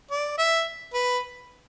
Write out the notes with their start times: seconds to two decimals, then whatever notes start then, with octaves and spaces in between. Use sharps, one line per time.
0.11 D5
0.38 E5
0.94 B4